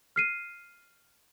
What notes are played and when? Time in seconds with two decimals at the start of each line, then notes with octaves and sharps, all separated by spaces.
0.16 F6 C7 D#7